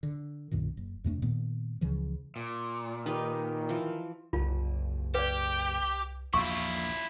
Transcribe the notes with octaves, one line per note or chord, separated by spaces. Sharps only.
D3
B1 F#2 A#2 D#3
F#1
F2 C3 A3 D4
A#2 D#3 B3
C#2 C#3 E3 F3
A#2
D#3 D#4 G4 B4
E3 F3
F#1 C2 F4
G4 B4 D5
A#1 E2 E4 F4 C#6